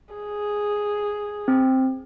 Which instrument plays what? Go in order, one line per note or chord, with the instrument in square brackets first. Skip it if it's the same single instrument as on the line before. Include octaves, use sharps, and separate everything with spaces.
[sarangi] G#4
[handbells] C4